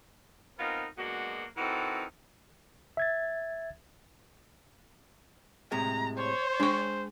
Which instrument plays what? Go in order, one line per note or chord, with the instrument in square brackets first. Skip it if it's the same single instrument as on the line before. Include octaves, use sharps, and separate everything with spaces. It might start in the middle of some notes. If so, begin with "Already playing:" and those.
[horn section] B3 C4 D#4 F4 A#4
F#3 G#3 A#3 B3 D4 F#4
E3 C4 D#4 F#4 A4 A#4
[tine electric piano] E5 G#6 A6
[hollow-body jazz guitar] A2 C3 G#3 [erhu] A#5
[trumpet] C5 [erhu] C#5
[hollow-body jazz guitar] G#3 G5 [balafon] D4 C#6